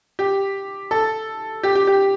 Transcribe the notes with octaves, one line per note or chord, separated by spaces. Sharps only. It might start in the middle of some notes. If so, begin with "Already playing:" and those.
G4
A4
G4
G4
G4